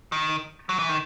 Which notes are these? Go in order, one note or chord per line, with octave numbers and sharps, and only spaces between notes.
D#3
F#3
E3
D#3